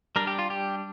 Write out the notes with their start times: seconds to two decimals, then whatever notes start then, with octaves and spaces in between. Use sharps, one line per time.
0.16 G3 D4 A#4
0.27 G4
0.39 F4
0.50 G4